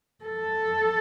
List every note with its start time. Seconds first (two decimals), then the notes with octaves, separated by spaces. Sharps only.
0.25 A4